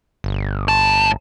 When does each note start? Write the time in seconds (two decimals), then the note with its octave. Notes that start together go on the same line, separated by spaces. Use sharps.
0.24 G1
0.68 A2 A5